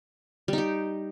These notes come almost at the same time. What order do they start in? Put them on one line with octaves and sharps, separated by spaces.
G3 D#4 G4